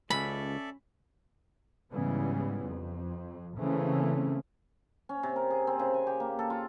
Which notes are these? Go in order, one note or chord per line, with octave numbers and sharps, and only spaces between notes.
C#2 C#4 A4 D5 E5 B5
G#2 C#3 E3 G3 B3
F2
C#3 E3 A3 A#3 C4 C#4
C#4
C3
A#4
G#4
C4
C#3
G#5
G4
A#3
A4
F4